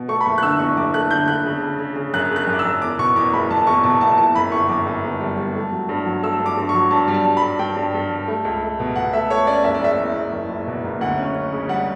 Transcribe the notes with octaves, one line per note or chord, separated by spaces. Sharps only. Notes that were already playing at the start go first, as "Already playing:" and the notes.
Already playing: B2
A3 C#6
B5
F#1 C#6
F#6
D3 E6
E2 C#6
F#1 D6
A3 F#6
D3 G6
D3 F#6
C#3
C#3
C#3
C#3
F#2 F#6
C#3
F#6
F#2
D6
E6
F#2
E2 D6
B2 C#6
E2 D6
F#1 B5
F#1 A5
E2 C#6
B2 A5
F#1 A5
E3 A5
F#2 B5
G1 C#6
F#2 D6
F#2
G1
G3
G3
A3
F#3
G2
F#3
A3 E6
G2
D6
G2
C#6
F#3
G2 A5
G3
A5
G3
B5
G2
G2 G5
G2
G2
G3
A3
C#2
A3
B2
B2 F#5
A3 E5
A3 C#5
C#4 D5
F#1 E5
D5
F#1 E5
E2
F#1
F#1
F#1
B2
F#1
D2 F#5
C#4
C#4
C#3
G3 F#5